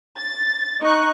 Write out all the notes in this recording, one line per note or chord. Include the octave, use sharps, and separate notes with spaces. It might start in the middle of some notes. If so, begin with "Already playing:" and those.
A6
D#4 C#6 F#6